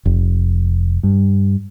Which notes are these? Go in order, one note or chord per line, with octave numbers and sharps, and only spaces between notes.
F1
G2